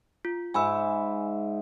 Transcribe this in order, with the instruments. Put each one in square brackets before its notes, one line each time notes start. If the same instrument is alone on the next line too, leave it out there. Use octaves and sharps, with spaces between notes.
[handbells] F4
[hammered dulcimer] G#2 E5 [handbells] G#5 B5 E6